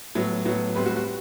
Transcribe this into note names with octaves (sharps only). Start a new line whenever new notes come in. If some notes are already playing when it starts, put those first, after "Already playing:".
A2 F#3 B3
A2 F#3 B3
A2 G3 C4 B4
F#4
F#4